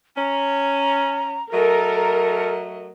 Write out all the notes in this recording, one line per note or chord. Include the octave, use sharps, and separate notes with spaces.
C#4 A#5
F#3 A3 A4 A#4 D#5